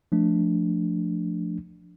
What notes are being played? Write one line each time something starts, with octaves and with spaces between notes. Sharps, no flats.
F3 A3 D4